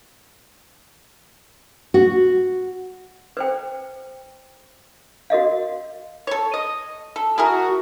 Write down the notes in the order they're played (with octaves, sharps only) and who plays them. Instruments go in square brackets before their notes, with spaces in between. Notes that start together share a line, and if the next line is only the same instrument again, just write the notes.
[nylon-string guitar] F#4
[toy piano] B4 C5 G5
F#4 A#4 D#5 F5
[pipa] A4 C#5
D#5
A4
[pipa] E4 G#4 A#4 [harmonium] F#4